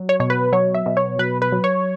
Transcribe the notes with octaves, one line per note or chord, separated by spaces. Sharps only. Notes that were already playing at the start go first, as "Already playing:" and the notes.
Already playing: F#3
C#5
B2 C#5
B4
F#3 C#5
E5
B2
C#5
F#3 B4
B4
F#3
C#5